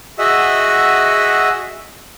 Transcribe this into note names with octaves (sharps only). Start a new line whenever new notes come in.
F#4 G#4 D#5 E5 F#5 E6